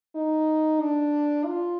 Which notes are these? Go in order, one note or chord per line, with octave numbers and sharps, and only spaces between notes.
D#4
D4
F4